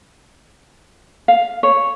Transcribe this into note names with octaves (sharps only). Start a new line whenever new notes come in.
F5
C#5